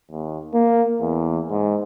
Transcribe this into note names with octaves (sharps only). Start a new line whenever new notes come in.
D#2
A#3
E2
G#2